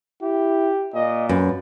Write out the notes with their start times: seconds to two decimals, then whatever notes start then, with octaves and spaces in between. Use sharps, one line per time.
0.22 E4 G4
0.94 A#2 D#5
1.29 F#2 B4